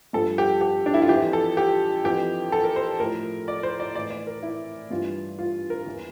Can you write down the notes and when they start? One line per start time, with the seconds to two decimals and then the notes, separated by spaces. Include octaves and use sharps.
0.13 G2 F3 A4
0.38 G4
0.61 G4
0.86 D4
0.94 E4
1.02 F4
1.09 F2 E3 G4
1.33 A4
1.57 G4
2.04 F2 E3 G4
2.52 A4
2.64 A#4
2.76 C5
3.00 A2 F3 A#4
3.48 D5
3.63 C5
3.80 D5
3.95 A2 E3 D5
4.11 D5
4.27 A#4
4.43 E4
4.91 G2 E3 F4
5.39 F4
5.70 A#4
5.86 E2 E3